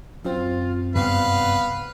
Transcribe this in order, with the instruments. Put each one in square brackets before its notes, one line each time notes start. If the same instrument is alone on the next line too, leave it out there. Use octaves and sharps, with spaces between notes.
[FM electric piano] F#2 C4 [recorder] F4
[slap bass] G2 C3 [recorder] B3 [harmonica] B4 F5